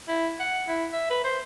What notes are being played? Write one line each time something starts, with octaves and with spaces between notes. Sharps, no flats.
E4
F#5
E4
E5
B4
C5